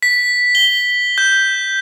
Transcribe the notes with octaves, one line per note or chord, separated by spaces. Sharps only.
B6
G7
G6